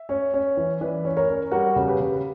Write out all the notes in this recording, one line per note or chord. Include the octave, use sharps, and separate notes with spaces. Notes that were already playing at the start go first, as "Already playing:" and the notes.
Already playing: E5
C#4
C#4
E3
E3 B4 D5
C#4
A#4 C#5
C#4
G3 F#4 A#4
C#3
G4 B4
C#3